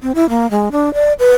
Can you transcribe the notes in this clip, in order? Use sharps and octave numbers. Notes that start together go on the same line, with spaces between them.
C4
E4
A#3
G#3
D4
D5
B4